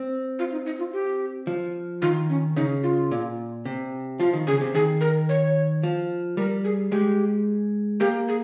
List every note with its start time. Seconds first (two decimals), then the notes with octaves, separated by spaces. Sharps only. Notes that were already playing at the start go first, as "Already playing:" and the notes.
Already playing: C4
0.39 F4
0.52 D#4
0.66 D#4
0.79 F4
0.93 G4
1.47 F3
2.02 D#3 F4
2.29 C#4
2.56 C#3 D#4
2.83 F4
3.11 A#2
3.65 C3
4.20 F3 F4
4.33 D#3
4.47 C#3 G#4
4.61 C3
4.74 D#3 G#4
5.01 A#4
5.29 C#5
5.83 F3
6.37 G3 A#4
6.64 G#4
6.92 G#3 G4
8.00 A#3 G4
8.28 G#4